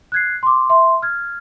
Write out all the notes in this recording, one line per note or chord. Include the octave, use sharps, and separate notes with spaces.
F#6 G#6 C7
C6 D6
E5 C6
F6 G#6